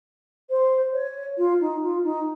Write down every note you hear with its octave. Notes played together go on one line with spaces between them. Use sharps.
C5
C#5
F4
D#4
F4
D#4